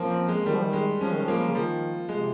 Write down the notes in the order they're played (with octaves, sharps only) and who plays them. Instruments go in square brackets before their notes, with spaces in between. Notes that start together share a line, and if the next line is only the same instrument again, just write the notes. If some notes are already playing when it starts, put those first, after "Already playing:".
Already playing: [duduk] F3 [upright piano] A#3 C4 C#4
[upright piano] C4
G#3
[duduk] D#3 [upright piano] G3
[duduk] F3
D#3
[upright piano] G#3
[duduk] F3 [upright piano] C#4
[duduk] D#3
F3
[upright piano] A#3
[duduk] C#3
[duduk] D#3 [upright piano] F3
[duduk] C3 [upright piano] G#3